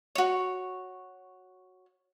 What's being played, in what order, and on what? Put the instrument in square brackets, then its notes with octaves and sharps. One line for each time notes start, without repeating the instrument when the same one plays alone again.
[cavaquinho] F#4 C#5